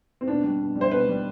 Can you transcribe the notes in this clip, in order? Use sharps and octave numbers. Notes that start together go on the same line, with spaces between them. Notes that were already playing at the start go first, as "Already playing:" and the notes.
C4
B2 D4
G3
B2
G3
C5
B2 B4
G3